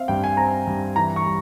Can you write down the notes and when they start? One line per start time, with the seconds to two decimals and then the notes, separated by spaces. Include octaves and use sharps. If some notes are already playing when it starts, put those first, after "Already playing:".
Already playing: C4 E5 F5
0.08 G2 G5
0.24 G#5
0.37 C4 A#5
0.67 G2
0.96 E3 A#5
1.16 C#6
1.26 G3